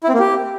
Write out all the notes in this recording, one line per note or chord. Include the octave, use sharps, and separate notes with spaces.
E4
C4
A#3
G4